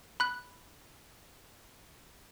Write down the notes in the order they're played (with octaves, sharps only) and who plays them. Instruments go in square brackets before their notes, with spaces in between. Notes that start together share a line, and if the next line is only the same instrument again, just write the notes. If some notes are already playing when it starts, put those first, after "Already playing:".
[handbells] B5 F#6